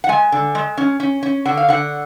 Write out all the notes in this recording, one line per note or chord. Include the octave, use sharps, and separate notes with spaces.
F#5
G#3 G#5
D3
G#3
C#4
C#4
C#4
D3 F#5
F5
D3 F#5